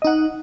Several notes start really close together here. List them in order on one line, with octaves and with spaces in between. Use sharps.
D#5 D#4 F#5